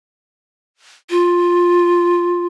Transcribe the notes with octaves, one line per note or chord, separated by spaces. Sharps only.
F4